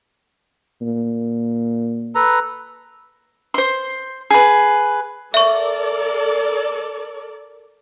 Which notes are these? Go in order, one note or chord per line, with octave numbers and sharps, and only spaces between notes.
A#2
A4 B4 A#5
C5 C6
G#4 B4
A4 A#4 D5 E5 C#6